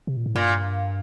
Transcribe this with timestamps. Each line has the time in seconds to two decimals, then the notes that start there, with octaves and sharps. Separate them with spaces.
0.07 C3
0.17 A#2
0.26 A2
0.35 G2 A#2